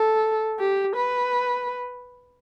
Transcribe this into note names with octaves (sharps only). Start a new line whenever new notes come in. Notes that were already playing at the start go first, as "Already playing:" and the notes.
Already playing: A4
G4
B4